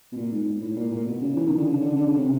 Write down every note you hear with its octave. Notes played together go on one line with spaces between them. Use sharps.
B2
A#2
G#2
A2
A#2
A#2
B2
C#3
E3
D#3
D3
C#3
D3
D3
C#3
C3